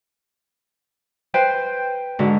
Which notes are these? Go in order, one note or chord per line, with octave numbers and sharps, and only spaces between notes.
B4 C5 G5
G#2 D3 F#4